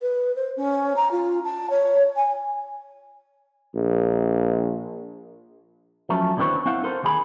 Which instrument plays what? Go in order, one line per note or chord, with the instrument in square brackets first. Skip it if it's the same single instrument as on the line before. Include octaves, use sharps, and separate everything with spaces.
[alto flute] B4
C5
C#4
A#5
F4
A5
C#5
G#5
[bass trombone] A#1
[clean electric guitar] F3 F#3 A3 C#4
D#2 D3 E3 C4 B4 C#5
C4 E4 F5 F#5
D#4 A4 A#4 C5
D#2 D#3 D#4 G#4 B5